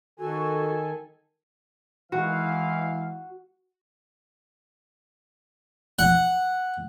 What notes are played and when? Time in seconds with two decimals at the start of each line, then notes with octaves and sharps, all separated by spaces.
0.20 D#3 F#4 A4 G#5
2.12 E3 G#3 F#4 F5
5.99 F#5